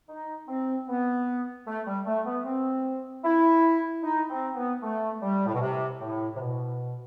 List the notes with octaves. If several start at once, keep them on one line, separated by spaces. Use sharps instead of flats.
D#4
C4
B3
A3
G3
A3
B3
C4
E4
D#4
C4
B3
A3
G3
A2
B2
C3
A2
C3
B2